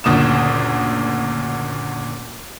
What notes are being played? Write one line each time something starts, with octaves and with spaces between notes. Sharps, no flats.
F#1 D2 A#2 D#6 E7